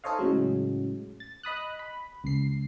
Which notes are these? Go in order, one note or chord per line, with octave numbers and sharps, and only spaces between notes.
D#4 A4 C5 C#5 D#5 F5
A2 C#3 F#3 G#3
A6
D#5 B5 D#6 F#6
B5
C#2 C7